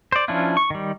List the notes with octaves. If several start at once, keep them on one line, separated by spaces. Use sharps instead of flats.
C5 D5
F3 C#4 D4 E4 F4
C#6
D#3 G3